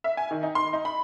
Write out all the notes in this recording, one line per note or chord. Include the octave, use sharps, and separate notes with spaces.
E5
G#5
D#3
D#4
C6
D#4
B5